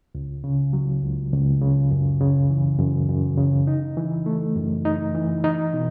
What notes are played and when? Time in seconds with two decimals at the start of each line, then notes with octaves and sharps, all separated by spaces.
0.15 C#2
0.44 C#3
0.73 F#3
1.02 C#2
1.32 C#2
1.62 C#3
1.91 F#2
2.21 C#3
2.50 E3
2.79 F#2
3.09 F#2
3.38 C#3
3.67 D#4
3.97 E3
4.26 A3
4.56 F#2
4.85 D#4
5.15 E3
5.44 D#4
5.73 B2